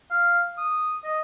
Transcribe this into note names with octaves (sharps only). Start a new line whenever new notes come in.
F5
D#6
D#5